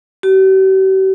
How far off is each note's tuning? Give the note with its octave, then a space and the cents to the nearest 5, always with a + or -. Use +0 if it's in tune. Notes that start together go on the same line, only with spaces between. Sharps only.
G4 -45